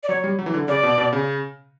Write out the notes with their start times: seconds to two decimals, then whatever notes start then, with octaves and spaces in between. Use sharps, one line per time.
0.03 D5
0.09 F#3 C#5
0.24 G3
0.39 F#3
0.46 E3
0.54 D3
0.68 C#3 D5
0.83 B2
0.98 B2
1.13 C#3